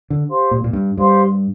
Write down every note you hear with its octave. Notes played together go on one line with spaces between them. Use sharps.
D3
G4 C5 F5 C6
A#2
A#2
G2
G2 G4 C5 F5 C6